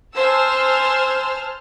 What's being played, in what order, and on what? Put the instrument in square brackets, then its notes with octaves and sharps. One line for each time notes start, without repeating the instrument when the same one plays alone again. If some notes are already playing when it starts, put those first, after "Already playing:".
[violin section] C5 G#5 A5 E6 F6